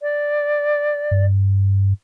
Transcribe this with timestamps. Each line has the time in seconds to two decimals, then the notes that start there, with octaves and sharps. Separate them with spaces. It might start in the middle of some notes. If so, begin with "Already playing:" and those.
0.02 D5
1.11 G2